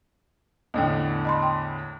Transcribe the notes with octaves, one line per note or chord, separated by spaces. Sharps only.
E2 A2 D3 D#5 G5
D#5 B5 C6
G5